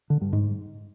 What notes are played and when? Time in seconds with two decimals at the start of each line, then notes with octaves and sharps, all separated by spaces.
0.10 D3
0.21 G2
0.33 G#2